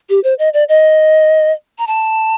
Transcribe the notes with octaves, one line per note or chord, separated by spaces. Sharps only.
G4
C5
D#5
D5
D#5
A#5
A5